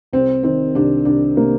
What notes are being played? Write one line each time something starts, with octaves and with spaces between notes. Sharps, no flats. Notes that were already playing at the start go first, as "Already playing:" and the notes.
C2 C4
D#3 C4
C2 D4
C2 D4
C3 A#3